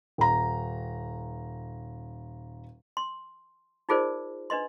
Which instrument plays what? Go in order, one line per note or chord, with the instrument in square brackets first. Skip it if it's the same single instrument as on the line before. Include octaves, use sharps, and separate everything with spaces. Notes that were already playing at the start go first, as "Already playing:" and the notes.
[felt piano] D#1 A#5
[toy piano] C6
D#4 F4 G#4 A#4 C5 D5
D4 B4 D#5 C6